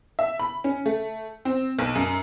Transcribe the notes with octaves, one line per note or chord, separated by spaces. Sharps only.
E5
B5
C#4
A3
C4
B1
F#2